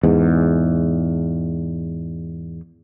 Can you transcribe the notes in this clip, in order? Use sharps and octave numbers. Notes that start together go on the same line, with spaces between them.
E2 G#2